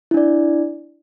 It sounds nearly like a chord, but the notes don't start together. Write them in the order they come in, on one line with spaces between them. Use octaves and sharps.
E4 D4 D5